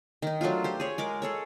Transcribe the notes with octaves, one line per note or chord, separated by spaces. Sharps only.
D#3 D#4
F#3 A3 D4 F4
G4 C5
G#4 C#5
G#3 A#4 D6
G#4 A4 C#5